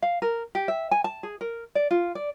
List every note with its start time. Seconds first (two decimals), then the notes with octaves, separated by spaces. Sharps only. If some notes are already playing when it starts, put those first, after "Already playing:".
0.02 F5
0.22 A#4
0.55 G4
0.68 E5
0.91 G#5
1.04 A5
1.23 G#4
1.41 A#4
1.75 D5
1.91 F4
2.15 D5